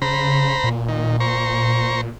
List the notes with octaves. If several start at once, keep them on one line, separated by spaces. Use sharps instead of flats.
C#3 C5 A#5 B5
A#2
D#3
C5 A#5 C#6